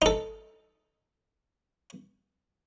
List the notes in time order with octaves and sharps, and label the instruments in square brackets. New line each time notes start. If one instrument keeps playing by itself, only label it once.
[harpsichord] D#4 A4